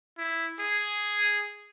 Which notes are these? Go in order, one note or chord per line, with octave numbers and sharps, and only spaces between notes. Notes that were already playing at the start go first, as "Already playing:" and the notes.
E4
G#4